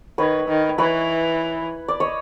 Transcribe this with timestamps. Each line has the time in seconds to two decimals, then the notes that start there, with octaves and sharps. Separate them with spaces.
0.18 D#3 B4 C#5
0.48 D#3
0.78 E3 B4 C#5
1.88 D5
2.00 C#5 D#5